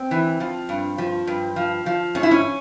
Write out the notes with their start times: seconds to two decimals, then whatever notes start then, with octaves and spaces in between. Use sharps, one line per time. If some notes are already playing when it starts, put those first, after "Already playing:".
Already playing: C4
0.11 E3
0.40 F3
0.69 G2
0.98 F3
1.27 G2
1.56 F3
1.86 F3
2.15 G#2 C#4
2.23 E4
2.31 C#4